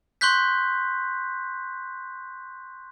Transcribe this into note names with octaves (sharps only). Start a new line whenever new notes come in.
C6 C#6 F#6 G6 B6